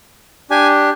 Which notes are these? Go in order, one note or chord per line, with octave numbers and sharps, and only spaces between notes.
D4 G4 G#5